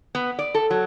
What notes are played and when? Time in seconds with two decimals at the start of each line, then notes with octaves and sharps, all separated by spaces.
0.15 B3
0.39 D5
0.55 A4
0.70 F#3